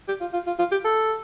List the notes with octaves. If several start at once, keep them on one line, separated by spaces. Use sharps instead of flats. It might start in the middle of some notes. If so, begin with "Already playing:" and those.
G4
F4
F4
F4
F4
G4
A4